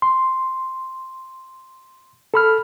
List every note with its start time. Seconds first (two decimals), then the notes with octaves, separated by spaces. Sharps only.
0.02 C6
2.34 A4 B5 F6